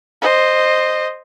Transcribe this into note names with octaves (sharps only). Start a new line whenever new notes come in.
C5 D#5